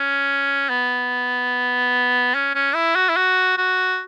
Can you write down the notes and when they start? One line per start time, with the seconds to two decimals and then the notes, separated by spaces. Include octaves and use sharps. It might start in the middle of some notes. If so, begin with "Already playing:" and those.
Already playing: C#4
0.70 B3
2.35 C#4
2.55 C#4
2.75 E4
2.96 F#4
3.09 E4
3.17 F#4
3.58 F#4